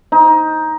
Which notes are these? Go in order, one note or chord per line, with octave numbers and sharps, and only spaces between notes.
D#4